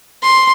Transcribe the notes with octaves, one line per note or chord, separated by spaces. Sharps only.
C6